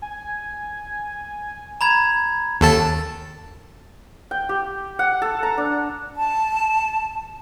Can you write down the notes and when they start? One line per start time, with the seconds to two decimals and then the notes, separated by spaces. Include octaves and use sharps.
0.02 G#5
1.81 A#5 B5 G#6
2.61 D#2 A4 A5
4.31 G5
4.49 G4
4.99 F#5
5.22 A4
5.43 A#5
5.58 D4
6.16 A5